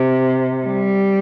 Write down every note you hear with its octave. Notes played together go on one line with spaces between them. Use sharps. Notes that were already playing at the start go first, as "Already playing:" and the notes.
Already playing: C3
G3